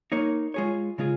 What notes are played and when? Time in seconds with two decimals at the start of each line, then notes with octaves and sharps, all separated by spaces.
0.12 A#3 D#4 C#5
0.54 G#3 F4 G#4 C#5
0.98 C#3 G#3 F4 G#4